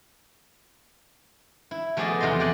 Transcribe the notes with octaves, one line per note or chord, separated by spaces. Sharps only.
E4
F3 A3 B3 G#4 D5 D#5
E2 C3 F3 D#5 C6
G4 D5 F#5 G#5